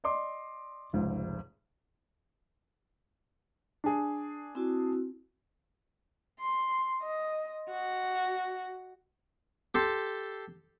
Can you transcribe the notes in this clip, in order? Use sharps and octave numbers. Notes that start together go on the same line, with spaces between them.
D5 D#5 C6 D6
F1 C#2 G#2
D4 G#4
C4 E4 F#4
C6
D#5
F#4
G4 A4 C6